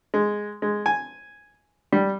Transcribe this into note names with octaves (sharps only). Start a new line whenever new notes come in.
G#3
G#3
G#5
G3